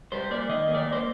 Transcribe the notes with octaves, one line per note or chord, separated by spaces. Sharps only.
G3 C5
A#3 D5
D#3 D#5
A#3
D5
A#3
C5